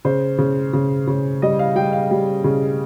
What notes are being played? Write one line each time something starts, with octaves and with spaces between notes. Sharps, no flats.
C#3 C5
C#3
C#3
C#3
G3 D#5
F5
G3 G5
F5
G3
C#3